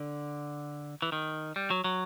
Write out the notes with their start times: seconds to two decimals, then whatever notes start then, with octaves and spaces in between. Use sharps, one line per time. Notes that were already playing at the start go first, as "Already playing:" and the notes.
Already playing: D3
1.02 E3
1.12 D#3
1.56 G3
1.71 F#3
1.84 F#3